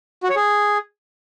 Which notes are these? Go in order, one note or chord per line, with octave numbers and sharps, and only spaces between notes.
F#4
C#5
G#4